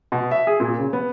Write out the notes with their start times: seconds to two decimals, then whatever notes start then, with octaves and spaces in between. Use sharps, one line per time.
0.12 B2
0.31 E5
0.47 G#4
0.60 A#2
0.78 C#3
0.93 B3